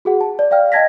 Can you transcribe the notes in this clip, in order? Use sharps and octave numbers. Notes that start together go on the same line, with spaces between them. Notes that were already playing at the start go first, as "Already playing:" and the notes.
F#4 G#4 F#5
A5
D5
D5 F5 G5 F6
D#5 G5 A5 G#6 A#6 B6